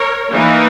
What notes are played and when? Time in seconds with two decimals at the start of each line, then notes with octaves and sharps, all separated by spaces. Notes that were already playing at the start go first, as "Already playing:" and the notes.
Already playing: A#4 C#5
0.32 E3 A#3 D#4